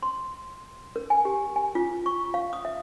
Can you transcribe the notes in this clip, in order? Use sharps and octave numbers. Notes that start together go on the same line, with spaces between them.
C6
A#4
G#5
G4
G#5
F4
C#6
F5
D#6
E5